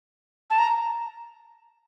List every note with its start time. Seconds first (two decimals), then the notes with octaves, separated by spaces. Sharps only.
0.50 A5
0.58 A#5